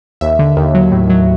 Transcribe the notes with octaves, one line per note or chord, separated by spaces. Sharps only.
D#2 E5
D3
D#2
F#3
A2
F#3